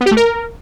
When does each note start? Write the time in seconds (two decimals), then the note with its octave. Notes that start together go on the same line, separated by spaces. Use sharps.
0.01 B3
0.06 G4
0.11 A3
0.17 A#4